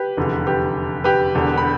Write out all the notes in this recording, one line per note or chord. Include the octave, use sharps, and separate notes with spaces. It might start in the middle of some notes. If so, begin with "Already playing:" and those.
Already playing: G4 B4
F1 E2 D3
G4 B4
G4 B4
E1 E2 D3
B5